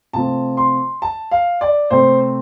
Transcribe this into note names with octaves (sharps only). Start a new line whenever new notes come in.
C3 F3 A3 C4 A5
C6
A5
F5
D5
C3 A3 C4 C5